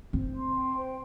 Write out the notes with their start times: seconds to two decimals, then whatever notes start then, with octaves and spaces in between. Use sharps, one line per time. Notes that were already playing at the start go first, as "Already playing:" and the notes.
0.13 C4 C5
0.34 C6
0.55 G5
0.75 C5